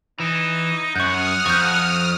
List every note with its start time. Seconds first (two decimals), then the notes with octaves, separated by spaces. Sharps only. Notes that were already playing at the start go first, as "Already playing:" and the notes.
0.20 E3 D#4
0.96 F#2 F#5 C#6 D#6 F6 G6
1.46 F2 C#6 G6